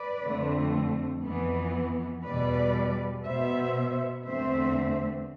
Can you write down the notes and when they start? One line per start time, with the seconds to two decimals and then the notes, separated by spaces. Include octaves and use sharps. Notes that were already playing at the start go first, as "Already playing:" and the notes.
Already playing: B4 D5
0.24 F2 D3 A3 C4
1.24 F2 E3 B3
2.25 E2 B2 G3 B4 D5
3.25 B2 B3 C5 E5
4.27 E2 D3 A3 C4 C5 E5